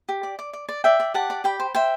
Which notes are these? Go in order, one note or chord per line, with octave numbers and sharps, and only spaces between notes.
G4
D5
D5
D5
D5
D5 E5 G5
D5
G4 F#5 A5
D5
G4 G5 B5
C5
C5 E5 G5